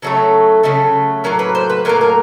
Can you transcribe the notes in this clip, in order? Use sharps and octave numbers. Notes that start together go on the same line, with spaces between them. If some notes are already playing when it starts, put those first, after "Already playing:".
C#3 F#3 A3 A4
C#3 F#3 A3
A2 F#3 A#3 A#4
B4
C5
B4
A2 F#3 A#3 A#4
A#4